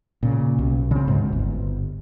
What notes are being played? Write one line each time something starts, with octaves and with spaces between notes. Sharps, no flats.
A#2 C#3
B1
C#3 C4
D2 G#2
G1